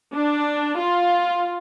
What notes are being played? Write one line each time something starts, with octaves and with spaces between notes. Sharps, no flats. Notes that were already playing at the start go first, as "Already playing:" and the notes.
D4
F4